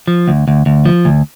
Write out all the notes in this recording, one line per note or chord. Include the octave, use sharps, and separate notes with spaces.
F3
D2
D2
D2
F3
D2